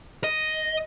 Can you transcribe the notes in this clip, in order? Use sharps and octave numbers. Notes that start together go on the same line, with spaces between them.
D#5